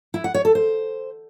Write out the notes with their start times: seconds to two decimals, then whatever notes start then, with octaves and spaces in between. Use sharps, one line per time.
0.14 E4
0.24 F#5
0.34 C#5
0.45 A4
0.55 C5